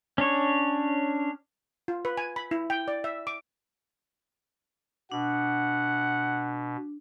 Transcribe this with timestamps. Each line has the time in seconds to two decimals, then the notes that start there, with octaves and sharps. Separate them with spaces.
0.18 C#4 D4 C#5
1.88 F4
2.05 B4
2.17 G#5
2.36 B5
2.51 E4
2.70 G5
2.88 D5
3.04 E5
3.27 D6
5.12 B2 D4 F#5